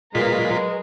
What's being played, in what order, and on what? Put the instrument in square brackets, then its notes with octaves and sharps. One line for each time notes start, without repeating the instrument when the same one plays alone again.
[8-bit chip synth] A#2 F4 B6 [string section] F#3 A#4 B4 [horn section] G#3